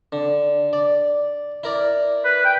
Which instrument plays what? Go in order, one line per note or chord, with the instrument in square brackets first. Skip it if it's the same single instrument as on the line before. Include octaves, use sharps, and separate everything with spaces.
[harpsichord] D3
D5
E4 A#4 D5
[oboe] B4
G5